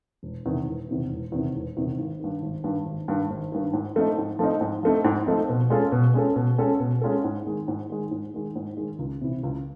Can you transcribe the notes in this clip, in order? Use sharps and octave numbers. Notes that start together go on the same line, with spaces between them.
E1
E2 C3 D#3
E1
E2 C3 D#3
E1
E2 C3 D#3
E1
E2 C3 D#3
G#1
G2 D#3
G#1
G2 D#3
G#1
G2 D#3
G#1
G2 D#3
G#2
F3 A3 C4 D#4
G#2
F3 A3 C4 D#4
G#2
F3 A3 C4 D#4
G#2
F3 A3 C4 D#4
B2
G#3 C#4 F4 A4
B2
G#3 C#4 F4 A4
B2
G#3 C#4 F4 A4
B2
G#3 C#4 F4 A4
G#2
D#3 G#3
G#2
D#3 G#3
G#2
D#3 G#3
G#2
D#3 G#3
C#2
C3 E3
C#2